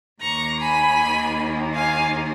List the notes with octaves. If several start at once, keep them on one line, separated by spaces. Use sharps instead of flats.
D#2 D#3 A#3 A#5 C#6
G#5 B5
F5 G#5